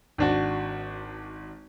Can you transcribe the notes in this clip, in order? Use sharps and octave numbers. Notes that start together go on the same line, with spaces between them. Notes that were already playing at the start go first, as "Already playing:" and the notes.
G#1 D4 F#4